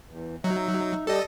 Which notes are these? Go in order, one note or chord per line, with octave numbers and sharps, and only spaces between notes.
E2
F#3 D#4 E5
G3 D4 G4 A4 D#5